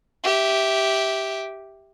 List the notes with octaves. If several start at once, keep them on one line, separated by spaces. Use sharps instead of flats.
G4 E5